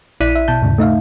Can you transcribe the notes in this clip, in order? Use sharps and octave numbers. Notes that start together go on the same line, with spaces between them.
A#1 E4 D5 F#6 B6 D#7
E5
B2 A5 G6
D#2 G#2 C#3
A3 D#4 E5 F5